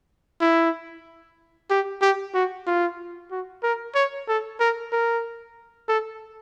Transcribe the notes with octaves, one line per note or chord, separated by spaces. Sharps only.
E4
G4
G4
F#4
F4
F#4
A#4
C#5
A4
A#4
A#4
A4